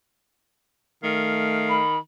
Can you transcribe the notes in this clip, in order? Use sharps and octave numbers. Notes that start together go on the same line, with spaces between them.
D#3 A3 F5
B5